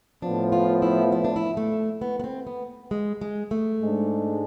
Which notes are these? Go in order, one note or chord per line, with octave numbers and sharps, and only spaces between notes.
A2 F3 B3 D4
F4
E4
E4
D4
E4
A3
B3
B3
C4
B3
G#3
G#3
A3
G#2 G#3 D4